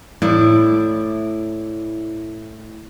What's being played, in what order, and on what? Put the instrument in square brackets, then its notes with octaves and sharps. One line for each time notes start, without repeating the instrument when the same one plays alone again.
[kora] A2 [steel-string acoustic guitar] E4 D5